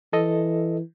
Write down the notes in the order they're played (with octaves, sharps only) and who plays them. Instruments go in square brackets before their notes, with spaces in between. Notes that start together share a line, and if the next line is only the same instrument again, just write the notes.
[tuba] E3 [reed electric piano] A4 D#5